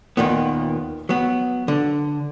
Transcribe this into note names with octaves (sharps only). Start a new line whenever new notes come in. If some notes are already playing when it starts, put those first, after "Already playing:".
D#2 A#2 D#3 B3
F#3 B3
D3